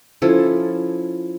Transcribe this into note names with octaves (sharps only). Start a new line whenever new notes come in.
F3 C#4 E4 A4